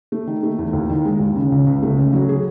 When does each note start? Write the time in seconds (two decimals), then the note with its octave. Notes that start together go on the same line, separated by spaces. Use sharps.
0.12 A3
0.27 D#3
0.43 A3
0.58 E2
0.73 D#2
0.90 D#3
1.05 G#3
1.20 D#2
1.35 C#3
1.52 C#2
1.67 C#2
1.83 A3
1.98 C#3
2.13 F#3
2.29 G#4